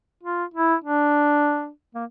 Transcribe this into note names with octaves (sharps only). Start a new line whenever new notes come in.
F4
E4
D4
A#3